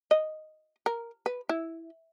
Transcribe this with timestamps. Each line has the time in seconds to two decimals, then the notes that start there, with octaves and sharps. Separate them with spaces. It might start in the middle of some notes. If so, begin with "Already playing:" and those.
0.11 D#5
0.86 A#4
1.26 B4
1.49 E4